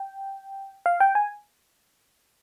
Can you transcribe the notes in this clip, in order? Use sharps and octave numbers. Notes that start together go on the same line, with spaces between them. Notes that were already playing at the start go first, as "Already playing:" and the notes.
Already playing: G5
F5
G5
G#5